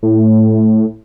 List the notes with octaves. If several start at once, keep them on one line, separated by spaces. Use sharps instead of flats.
A2